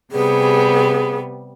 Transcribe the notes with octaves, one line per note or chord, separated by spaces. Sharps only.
C3 G3 B3 G#4